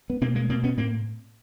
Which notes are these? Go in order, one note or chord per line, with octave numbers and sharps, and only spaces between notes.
B3
B2 A#3 C4
G#3 A#3
B2 A#3 C4
B3 C#4
A2 A#3 C4